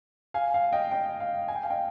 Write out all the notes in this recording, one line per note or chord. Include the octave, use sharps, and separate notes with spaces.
F5 G#5
F5
D#5 G5
D#5 G5
F5
G#5
G5
F5
D#5 G5